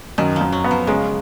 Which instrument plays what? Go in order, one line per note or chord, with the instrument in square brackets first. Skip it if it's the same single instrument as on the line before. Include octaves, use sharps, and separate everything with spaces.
[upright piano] F#2 [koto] D#3
[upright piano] F#2 [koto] F3
[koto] F#3
[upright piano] B3
[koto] F3
[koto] C#3 [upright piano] G#3